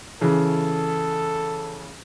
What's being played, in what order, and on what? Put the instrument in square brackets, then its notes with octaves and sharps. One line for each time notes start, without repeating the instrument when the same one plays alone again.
[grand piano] C#3 E3 [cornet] A4